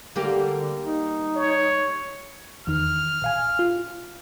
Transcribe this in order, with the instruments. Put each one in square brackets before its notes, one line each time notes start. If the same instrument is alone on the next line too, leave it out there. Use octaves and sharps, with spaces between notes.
[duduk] D3 [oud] G3 A#3 G4
[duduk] D#4
[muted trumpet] C#5
[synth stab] E2 D#3 [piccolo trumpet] F6
[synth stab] A#1 F5 G#5
F4